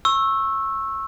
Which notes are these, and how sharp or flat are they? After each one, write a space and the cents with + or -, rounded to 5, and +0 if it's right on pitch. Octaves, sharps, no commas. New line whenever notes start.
C#6 -25 E6 +0